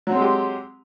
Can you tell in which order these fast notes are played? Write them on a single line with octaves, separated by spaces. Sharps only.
F#3 C4 G#3 G4